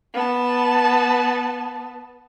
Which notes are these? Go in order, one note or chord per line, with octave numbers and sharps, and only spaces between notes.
B3 A5